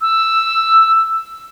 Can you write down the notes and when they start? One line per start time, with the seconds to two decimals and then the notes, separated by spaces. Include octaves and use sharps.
0.01 E6